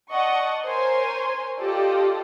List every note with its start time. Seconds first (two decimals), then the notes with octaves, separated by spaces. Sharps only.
0.10 D5 D#5 F#5 A5 C#6
0.65 A#4 C5 C#5 G#5 C6
1.60 F4 G4 A4 D5 D#5